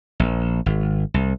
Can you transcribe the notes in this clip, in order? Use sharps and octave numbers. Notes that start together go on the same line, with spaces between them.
A#1
G#1
C2